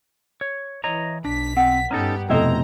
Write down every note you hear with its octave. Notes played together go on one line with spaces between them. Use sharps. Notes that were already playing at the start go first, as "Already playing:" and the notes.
C#5
E3 C#5 D#5 A#5
B1 D4 B6
C4 F#5
G2 B3 C#4 D#4 G4 A4 A#5
F1 B2 E4 A4 C5 D#5 G5 A#5